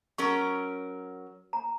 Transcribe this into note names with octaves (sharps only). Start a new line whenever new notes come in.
F#3 C#4 A#4 C#6
A#5